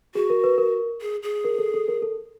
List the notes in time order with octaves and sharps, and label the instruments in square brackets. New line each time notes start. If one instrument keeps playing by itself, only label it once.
[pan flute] F#4 [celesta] G#4
[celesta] A#4
B4
A#4
[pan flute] G#4
G#4
[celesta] A#4
A4
A4
A#4
A4